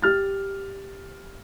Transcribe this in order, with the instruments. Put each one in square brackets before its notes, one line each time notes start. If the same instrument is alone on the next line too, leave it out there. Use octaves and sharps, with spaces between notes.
[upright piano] G4 F6 A6